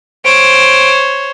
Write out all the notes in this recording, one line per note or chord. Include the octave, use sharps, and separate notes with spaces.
C5 C#5 D7